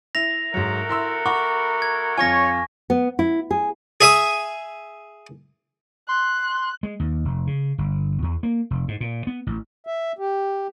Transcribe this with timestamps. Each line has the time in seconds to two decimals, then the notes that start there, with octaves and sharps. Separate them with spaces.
0.15 E4 A#6 F7
0.54 G#2 F#3 A3 F#4 A#4
0.89 E4 C6 E6
1.26 F#5 B5 C#6 D6
1.82 G#6
2.18 F2 F4 C#5 G#5 C#6 A#6
2.90 B3
3.19 E4
3.51 G#4
4.01 G#4 E5 D#6
6.09 C6 F#6
6.83 G#3
7.00 D#2
7.25 F1
7.47 C#3
7.78 G1
8.23 E2
8.43 A#3
8.71 F1
8.88 G#2
9.00 A#2
9.27 B3
9.47 A1
9.87 E5
10.19 G4